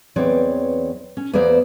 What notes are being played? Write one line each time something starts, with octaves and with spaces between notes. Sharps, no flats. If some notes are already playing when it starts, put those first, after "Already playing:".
E2 E3 F#3 C4 C#5 D5
C#4
E2 A#3 B3 C5 D5